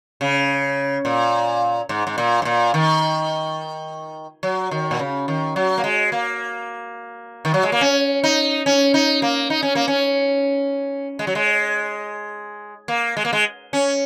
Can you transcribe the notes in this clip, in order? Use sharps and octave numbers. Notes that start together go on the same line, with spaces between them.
C#3
A#2
G#2
G#2
A#2
G#2
A#2
D#3
F#3
D#3
A#2
C#3
D#3
F#3
A#3
G#3
A#3
D#3
F#3
G#3
A#3
C#4
D#4
C#4
D#4
A#3
D#4
C#4
A#3
C#4
G#3
F#3
G#3
A#3
G#3
A#3
G#3
C#4